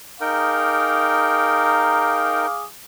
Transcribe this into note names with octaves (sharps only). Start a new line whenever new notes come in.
D#4 G#4 A#4 F5 G5 D6